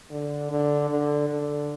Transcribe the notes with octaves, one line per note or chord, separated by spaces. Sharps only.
D3
D3
D3
D3